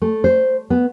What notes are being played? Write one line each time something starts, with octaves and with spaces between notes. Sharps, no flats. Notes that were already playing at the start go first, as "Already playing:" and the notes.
A3
C5
B3